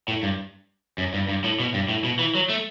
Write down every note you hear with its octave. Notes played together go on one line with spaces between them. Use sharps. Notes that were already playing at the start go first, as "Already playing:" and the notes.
A2
G2
F#2
G2
G2
A2
B2
G2
A2
B2
E3
F#3
A3